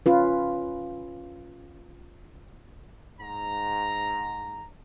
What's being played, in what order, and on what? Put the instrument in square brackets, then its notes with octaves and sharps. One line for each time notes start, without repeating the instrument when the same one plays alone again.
[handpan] C#4 F4 B4
[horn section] G#2 A#5